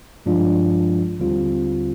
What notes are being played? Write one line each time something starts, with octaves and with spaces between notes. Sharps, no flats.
G2 F3 G#3 D4 F4
D#2 D3 G3 C4 F4